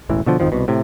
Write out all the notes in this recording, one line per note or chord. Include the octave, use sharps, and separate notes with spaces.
E1 A1 E3
B2 D3 F3
G#1 F2 D#3 F3
C2 B2
A2 C3